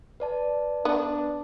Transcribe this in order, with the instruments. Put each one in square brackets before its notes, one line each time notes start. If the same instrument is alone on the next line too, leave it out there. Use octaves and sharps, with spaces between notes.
[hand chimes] B4 D5 A5
[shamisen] B3 [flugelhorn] D4